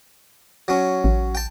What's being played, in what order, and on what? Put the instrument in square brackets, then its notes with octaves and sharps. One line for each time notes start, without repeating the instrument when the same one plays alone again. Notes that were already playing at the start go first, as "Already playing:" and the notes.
[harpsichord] F#3 C#4
[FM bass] A1
[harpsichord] G5 A5